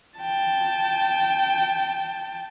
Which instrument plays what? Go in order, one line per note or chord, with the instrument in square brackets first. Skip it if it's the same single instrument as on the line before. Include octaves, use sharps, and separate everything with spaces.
[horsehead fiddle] G5 A5